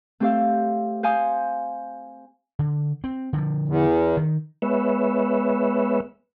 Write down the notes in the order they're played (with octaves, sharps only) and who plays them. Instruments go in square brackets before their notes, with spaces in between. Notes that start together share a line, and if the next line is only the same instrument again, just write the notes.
[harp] A3 C4 G4 C5 F5
C5 F5 G#5 D#6
[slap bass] D3
C4
D3 F3
[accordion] E2
[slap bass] D#3
[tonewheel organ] G#3 B3 B4 C#5 E5